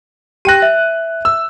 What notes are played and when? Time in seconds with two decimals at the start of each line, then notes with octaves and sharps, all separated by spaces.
0.45 G4 G5 F#6 A#6 D#7
0.62 E5
1.25 E6